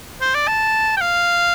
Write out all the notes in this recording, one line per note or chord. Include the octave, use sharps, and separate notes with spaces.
C5
D5
A5
G5
F5